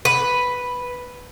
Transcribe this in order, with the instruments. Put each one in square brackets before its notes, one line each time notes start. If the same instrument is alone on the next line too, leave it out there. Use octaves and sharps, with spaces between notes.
[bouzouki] B4